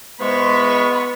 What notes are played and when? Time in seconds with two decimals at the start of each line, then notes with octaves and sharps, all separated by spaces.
0.20 G#2 E3 G#3 B3 B5 C#6